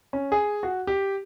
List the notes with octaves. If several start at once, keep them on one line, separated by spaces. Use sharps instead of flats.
C#4
G#4
F#4
G4